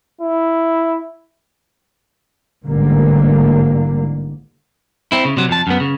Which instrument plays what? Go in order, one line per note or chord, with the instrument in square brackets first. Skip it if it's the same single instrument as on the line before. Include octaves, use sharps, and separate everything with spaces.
[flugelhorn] E4
[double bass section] A1 G#2 D3 G3 A#3
[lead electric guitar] C4 E4
C#3
C3 F#3
F2 A5
F#2 B3
C#3